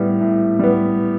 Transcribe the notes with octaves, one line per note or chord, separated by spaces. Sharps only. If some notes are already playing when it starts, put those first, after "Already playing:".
Already playing: A2 G3 B3
A2
G3 B3